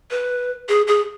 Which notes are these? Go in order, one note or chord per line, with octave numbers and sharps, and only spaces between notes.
B4
G#4
G#4